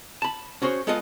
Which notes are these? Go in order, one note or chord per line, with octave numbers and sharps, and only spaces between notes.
A5 B5
C#4 F#4 G#4 C5 C#5
G#3 B3 F4 G#4 A4 D#5